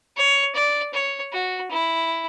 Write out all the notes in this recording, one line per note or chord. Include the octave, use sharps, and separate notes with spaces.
C#5
D5
C#5
F#4
E4